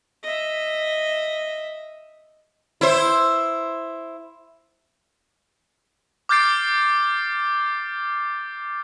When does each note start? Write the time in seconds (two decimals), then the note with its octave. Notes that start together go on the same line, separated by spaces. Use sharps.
0.23 D#5 E5
2.81 E4 C5
6.29 D6 F6 G6 A6 C7 D7